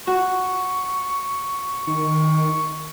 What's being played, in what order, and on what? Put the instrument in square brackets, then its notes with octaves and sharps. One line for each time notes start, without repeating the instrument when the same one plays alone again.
[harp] F#4 [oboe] C#6
[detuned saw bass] D#3 [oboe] C#6